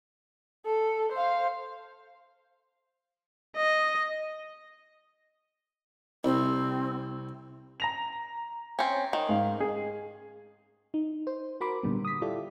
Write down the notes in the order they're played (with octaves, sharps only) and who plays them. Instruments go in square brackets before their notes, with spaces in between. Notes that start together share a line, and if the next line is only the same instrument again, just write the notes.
[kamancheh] A4
C5 F5
[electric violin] D#5
[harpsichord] C2 [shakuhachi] C4
[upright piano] A#5 A#6 F7
[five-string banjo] C4 C#4
D#3
[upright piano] G#2 F5
G#4
[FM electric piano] D#4
C5
F#4 A#4 B5 C6 D6
A#2 D3 G3 B3
D#6 B6
E4 F4 G4 A4 D5